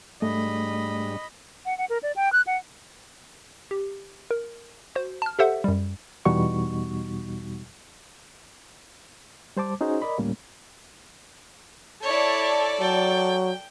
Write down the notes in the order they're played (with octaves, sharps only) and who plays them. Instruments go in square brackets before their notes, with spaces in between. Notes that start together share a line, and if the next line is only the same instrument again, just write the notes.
[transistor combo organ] G#2 G3 D4 [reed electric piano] A3 [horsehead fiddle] D#5 B5
[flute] F#5
F#5
A#4
D5
G5
F#6
F#5
[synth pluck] G4
A#4
F#4 C5
A5 F6
G4 A4 C5 E5 F#5
F#2 G3
[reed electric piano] E2 B2 G3 D#4 F#4 C#6
G3 C5 A5 D6
C#4 D#4 F#4 G#4 C5
A#4 D5 D#5 B5
D2 A2 G3 A#3 C#4
[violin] E4 C#5 [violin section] A4 D5
[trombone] F#3 [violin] G5